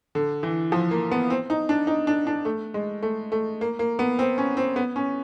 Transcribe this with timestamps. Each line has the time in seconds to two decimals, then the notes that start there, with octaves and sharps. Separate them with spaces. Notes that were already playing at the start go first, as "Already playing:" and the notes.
0.15 D3
0.43 E3
0.72 F3
0.91 A#3
1.11 B3
1.30 C4
1.50 D#4
1.69 D4
1.87 D#4
2.07 D4
2.27 D4
2.45 A3
2.74 G#3
3.03 A3
3.32 A3
3.61 A#3
3.79 A#3
3.99 B3
4.19 C4
4.38 C#4
4.57 C4
4.76 B3
4.96 C#4